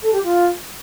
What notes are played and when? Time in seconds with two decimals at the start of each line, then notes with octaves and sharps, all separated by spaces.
0.02 A4
0.13 G4
0.23 F4